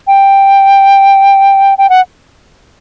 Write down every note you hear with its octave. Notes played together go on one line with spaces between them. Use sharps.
G5
G5
F#5